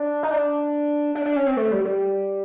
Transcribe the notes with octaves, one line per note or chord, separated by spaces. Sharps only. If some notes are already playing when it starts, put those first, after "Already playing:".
Already playing: D4
D#4
D4
D4
D4
C#4
C4
A3
G3
G3